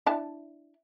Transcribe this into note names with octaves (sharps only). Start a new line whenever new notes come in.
D4 E4 A5